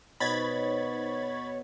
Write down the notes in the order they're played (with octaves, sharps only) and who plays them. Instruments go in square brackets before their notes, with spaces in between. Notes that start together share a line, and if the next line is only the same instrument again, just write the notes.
[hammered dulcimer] B2 [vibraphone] D#4 C5 [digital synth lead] C#5 [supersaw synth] B5 G#6 A6